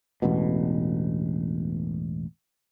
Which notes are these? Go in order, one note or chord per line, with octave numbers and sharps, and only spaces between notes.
E1 A1 B2